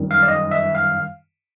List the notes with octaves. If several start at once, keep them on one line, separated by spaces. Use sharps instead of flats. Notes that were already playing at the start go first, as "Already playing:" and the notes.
Already playing: F#2 D#3 G3
F5
D5
D#5
E5
F5